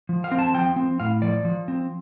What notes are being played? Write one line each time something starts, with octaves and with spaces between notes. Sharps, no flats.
F3
F5
C4
A5
F3 G5
C4
A2 F5
F3 D5
F3
C4